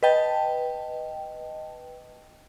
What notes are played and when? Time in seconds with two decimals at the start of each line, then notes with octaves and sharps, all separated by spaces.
0.03 B4 D#5 G5 A5